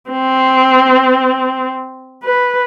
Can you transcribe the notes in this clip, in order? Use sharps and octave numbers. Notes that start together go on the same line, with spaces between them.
C4
B4